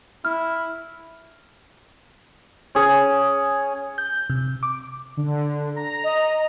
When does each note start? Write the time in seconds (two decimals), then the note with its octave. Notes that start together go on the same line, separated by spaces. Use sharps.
0.25 E4 F6
2.75 C#4 G#4 C#5
3.98 G6
4.30 C3
4.63 D6
5.17 D3
5.76 A#5
6.04 D#5